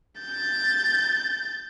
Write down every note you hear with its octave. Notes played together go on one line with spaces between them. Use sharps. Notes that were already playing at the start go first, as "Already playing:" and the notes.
G6 A6